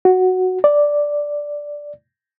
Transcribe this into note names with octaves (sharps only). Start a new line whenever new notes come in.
F#4
D5